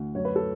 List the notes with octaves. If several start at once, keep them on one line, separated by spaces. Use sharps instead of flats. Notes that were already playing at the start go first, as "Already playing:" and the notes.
Already playing: D2
F#2 C#5
B4
A4